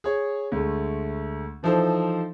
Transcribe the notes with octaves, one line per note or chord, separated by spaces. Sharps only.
G#4 C#5
D2 G#3 A3
E3 F3 D#4 A4 C5